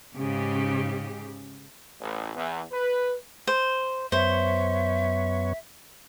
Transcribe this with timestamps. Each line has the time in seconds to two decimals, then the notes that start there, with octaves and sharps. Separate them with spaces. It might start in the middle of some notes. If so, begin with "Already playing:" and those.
0.17 G#2 C#3 G4
2.00 A1
2.36 E2
2.72 B4
3.47 C5
4.12 F#2 B3 C5 C#5 E5